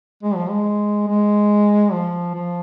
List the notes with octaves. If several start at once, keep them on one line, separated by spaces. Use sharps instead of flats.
G#3
F3
G#3
G#3
F3
F3